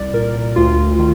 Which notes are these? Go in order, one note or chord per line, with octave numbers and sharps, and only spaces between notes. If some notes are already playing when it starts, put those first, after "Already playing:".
Already playing: C2 D5
A#2 A#4
D2 F4
D#3